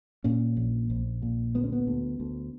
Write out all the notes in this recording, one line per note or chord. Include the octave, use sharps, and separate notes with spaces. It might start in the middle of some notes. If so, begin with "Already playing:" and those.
A#2 C#4
A#1
A#1
A#2
D2 B3
C#4
B3
D2
D2